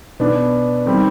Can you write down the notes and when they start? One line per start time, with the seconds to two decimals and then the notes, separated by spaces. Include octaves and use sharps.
0.20 B2 B3 D4
0.86 D#3 G3 C4